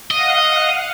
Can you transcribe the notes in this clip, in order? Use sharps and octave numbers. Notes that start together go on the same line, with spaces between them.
D#5 F5 F#5